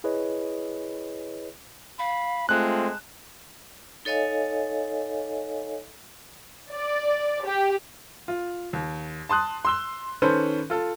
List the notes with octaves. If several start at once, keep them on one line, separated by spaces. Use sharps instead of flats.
E4 G#4 B4 C#5 D#5
F5 B5
G#3 A3 C4 F4 A5 F#6
D#4 A4 C#5 D#5 F5 G#5
D5
G4
F4
D#2
A5 C6 D#6 F#6
C6 E6 G7
D#3 C#4 A4 B4 C5
F4 A4